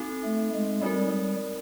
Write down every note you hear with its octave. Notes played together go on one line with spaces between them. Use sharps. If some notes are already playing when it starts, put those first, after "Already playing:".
Already playing: C4 D#4 F#4 A4
A3
G#3
G3 G#3 C4 D#4 F#4 A#4
G3